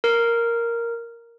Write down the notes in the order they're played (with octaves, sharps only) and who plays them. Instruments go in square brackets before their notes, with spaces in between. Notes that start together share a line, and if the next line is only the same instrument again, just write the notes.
[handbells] A#4